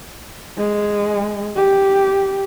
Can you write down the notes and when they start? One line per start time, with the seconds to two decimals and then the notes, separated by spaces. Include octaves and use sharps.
0.57 G#3
1.56 G4